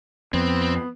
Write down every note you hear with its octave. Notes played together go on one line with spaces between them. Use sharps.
F2 B3 C4